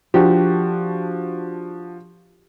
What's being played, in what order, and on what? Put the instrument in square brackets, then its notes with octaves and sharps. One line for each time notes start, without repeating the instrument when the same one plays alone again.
[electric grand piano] F3 D4 F#4 [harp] G4